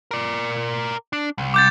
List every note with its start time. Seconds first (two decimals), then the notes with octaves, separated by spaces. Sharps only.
0.11 A#4 D5
1.13 D4
1.38 C2
1.54 D6 G6 A6